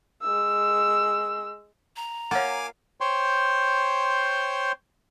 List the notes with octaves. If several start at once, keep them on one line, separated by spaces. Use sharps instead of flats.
G#3 E6
A#5
A#3 F4 C#5 F#5 G#5 D6
C5 C#5 G5 C6